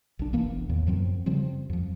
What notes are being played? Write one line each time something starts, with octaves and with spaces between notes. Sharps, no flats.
B1 D4
F1 E3 A#3 B3
E2 A2 D#3
F#2 F3 F#3 C4
C#3 F3 G3 C4
F2 F3